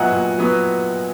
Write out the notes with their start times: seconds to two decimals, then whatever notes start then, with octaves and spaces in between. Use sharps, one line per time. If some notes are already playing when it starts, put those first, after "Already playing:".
Already playing: A#2 F#3 B3 D#5 E5 F#5 G#5 A#5
0.10 A#2
0.38 F#3 B3